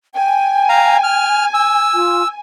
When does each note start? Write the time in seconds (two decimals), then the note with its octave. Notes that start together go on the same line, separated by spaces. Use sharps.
0.15 G5 G#5
0.69 F5 A#5
1.03 F6
1.54 E6
1.94 F4